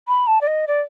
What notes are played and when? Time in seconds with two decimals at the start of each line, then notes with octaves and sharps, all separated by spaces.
0.08 B5
0.27 A5
0.41 D5
0.47 D#5
0.68 D5